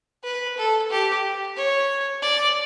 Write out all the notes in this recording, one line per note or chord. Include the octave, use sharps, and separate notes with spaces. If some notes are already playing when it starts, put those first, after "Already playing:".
B4
A4
G4
C#5
D5